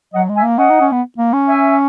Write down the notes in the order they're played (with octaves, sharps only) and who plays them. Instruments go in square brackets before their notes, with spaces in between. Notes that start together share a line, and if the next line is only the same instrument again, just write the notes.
[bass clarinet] F#3 [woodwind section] D#5 F#5
[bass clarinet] G#3
[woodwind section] E5 G#5
[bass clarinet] A#3
[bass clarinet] C#4 [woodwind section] D#5 F#5
[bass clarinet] D#4
C#4
B3
A#3
C#4
[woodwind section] E5 G#5